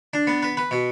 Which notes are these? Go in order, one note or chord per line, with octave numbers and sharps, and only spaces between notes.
D4
B3
B4
B4
B2